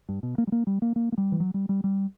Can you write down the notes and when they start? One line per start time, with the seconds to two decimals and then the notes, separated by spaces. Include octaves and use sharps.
0.09 G2
0.23 B2
0.38 A#3
0.47 G3
0.52 A#3
0.67 G3
0.82 A#3
0.96 A#3
1.12 A#3
1.18 G3
1.32 E3
1.40 F#3
1.54 G3
1.69 G3
1.84 G3